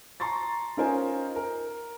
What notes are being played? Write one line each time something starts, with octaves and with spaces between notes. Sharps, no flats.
A5 A#5 C6 C#6 A6
C#4 D#4 F4 A#4 C5 G#5
A#4